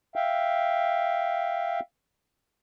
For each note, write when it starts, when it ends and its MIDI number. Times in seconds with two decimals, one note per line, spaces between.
0.16 1.80 76
0.16 1.80 77
0.16 1.80 79